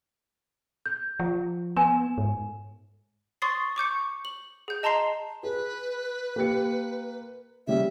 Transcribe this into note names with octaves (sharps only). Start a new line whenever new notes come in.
G6
F3
B3 G#5 E7
G#2
C6 C#6 D#6 A6 C7
C#6 D6 G6 C#7
F#7
G#4 G6
D#5 A5 A#5 C6 C7
G#4 B4
A#3 G4 C#7
C#3 G3 C#4 E5